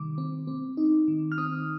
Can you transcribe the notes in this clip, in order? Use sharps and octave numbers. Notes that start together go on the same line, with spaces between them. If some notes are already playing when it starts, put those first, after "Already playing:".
Already playing: C3 D#3 G3 D6
C4
C4
D#4
D#3
F6
C4 D#6